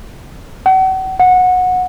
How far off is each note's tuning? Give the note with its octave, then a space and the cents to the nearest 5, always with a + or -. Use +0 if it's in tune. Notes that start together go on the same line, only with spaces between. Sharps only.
F#5 +40
F#5 -20